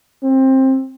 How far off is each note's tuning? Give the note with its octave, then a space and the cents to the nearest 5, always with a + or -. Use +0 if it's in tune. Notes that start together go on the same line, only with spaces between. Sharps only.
C4 +20